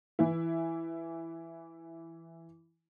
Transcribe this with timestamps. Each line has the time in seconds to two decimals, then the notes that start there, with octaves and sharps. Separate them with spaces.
0.19 E3 E4